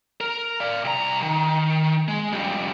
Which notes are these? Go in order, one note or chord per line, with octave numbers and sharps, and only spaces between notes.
A#4
D5 F5
C2 A#5
D#3
G#3
F2 G3